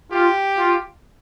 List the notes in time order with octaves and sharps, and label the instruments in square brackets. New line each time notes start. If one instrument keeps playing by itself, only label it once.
[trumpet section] F4 [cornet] G4
[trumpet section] F4